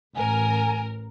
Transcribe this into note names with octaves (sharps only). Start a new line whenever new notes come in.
A1 A#4 G#5